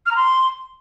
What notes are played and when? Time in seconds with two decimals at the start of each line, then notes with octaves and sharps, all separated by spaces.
0.05 F6
0.10 A#5
0.15 C6